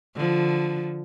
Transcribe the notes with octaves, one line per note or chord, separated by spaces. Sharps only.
D3 F3